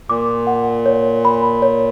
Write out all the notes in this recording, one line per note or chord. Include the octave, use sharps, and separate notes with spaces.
A#2 D6
F#5
C#5
B5
C#5